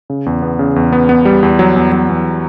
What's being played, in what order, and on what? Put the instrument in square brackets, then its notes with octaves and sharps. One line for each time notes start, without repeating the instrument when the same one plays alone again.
[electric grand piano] C#3
E2
B3
C#3
E2
B3
B3
G3
E2
F#3
E2
F#3
E2